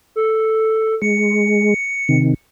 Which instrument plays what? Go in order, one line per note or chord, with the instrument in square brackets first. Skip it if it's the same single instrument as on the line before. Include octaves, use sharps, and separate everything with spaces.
[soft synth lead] A4
[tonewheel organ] G#3 [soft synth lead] C#7
[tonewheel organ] C3 D#3